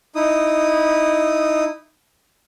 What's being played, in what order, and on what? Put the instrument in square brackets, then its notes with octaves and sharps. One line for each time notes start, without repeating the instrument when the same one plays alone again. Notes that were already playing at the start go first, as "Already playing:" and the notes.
[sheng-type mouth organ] D#4 E4 D#6